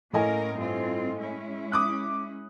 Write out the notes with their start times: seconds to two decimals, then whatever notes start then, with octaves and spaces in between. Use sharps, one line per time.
0.13 A2 A#3 C#4 A#4 D#5 G#5
0.56 G2 C4 F4
1.19 G#3 C#4 E4
1.72 D6 D#6 F#6